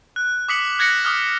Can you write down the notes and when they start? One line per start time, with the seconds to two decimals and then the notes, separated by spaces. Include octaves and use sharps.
0.16 F#6
0.49 D6 D#6 B6 C#7 F#7
0.79 F#6 G#6 A#6 B6 C#7 F#7
1.05 D6 D#6 F6